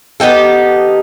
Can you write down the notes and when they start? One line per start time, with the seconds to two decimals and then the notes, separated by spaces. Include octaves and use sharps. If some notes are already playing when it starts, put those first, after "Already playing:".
0.20 B3 D#4 G4 A4